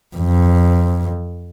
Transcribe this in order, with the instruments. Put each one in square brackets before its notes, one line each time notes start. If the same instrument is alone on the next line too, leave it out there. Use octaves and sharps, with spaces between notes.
[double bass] F2